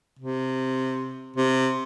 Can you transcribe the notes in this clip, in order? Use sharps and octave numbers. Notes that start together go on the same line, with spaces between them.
C3
C3